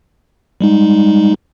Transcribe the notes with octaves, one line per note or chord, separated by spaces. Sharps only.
G3 G#3 D#4